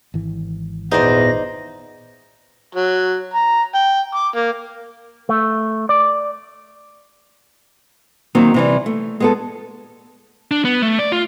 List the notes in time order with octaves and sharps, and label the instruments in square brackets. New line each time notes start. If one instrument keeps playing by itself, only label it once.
[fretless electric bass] G#1 E3
[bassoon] E2 [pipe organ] A#2 B3 A#6 [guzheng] D#4 C5 D5
[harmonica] F#3
A#5
G5
D6
A#3
[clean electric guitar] A3
D5
[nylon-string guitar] D#3 F#3 A#3 C4
C3 E3 G3
A3
G#3 B3 A4
[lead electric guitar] D4
B3
A3
D5
F4